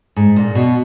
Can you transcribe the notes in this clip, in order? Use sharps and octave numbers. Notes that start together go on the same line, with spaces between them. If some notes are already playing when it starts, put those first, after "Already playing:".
G#2
A#2
B2